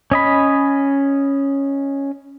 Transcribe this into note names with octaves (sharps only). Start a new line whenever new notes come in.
C#4 D#5 B5